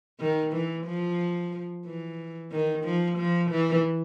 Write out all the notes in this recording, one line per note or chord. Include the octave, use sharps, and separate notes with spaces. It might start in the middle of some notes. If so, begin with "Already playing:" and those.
D#3
E3
F3
E3
D#3
F3
F3
E3